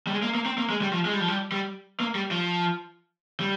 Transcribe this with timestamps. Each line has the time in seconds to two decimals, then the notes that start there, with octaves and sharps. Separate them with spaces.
0.07 G3
0.11 G#3
0.22 A#3
0.35 A#3
0.46 C4
0.58 A#3
0.70 G#3
0.81 G3
0.93 F3
1.05 G#3
1.13 G3
1.21 F3
1.28 G3
1.52 G3
2.00 A#3
2.15 G3
2.31 F3
3.40 G3